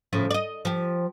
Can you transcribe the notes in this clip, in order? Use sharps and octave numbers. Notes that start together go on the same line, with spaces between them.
A2 C#3 F3
D5 D#5
F3 G4